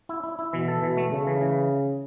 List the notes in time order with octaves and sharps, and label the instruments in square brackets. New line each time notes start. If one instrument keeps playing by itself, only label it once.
[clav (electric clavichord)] E4
E4
E4
[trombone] B2 [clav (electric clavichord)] E3
[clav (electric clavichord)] A4
[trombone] B2 [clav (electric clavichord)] E3
[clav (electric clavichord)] A3
[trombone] C#3 [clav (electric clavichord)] A3
[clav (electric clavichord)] E3
E3